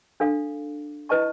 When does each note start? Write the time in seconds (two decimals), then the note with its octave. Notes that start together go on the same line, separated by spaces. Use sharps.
0.20 D4 A4 F5
1.09 E4 B4 D#5 A5 C#6